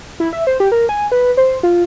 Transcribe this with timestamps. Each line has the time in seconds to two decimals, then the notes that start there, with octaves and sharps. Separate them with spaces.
0.20 E4
0.33 E5
0.47 C5
0.60 G4
0.72 A#4
0.89 G#5
1.12 B4
1.37 C5
1.63 F4